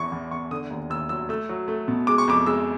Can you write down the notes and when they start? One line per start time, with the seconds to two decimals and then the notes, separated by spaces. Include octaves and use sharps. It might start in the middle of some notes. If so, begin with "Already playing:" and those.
Already playing: E2 E3 C#6
0.12 E2
0.31 E2 C#6
0.51 D3 D#6
0.70 D#2
0.90 D#2 E6
1.09 F#3 E6
1.29 A3 E6
1.49 F#3
1.68 A3
1.88 B2
2.07 G#3 D6
2.18 C#6
2.28 F2 D6
2.46 G#3 E6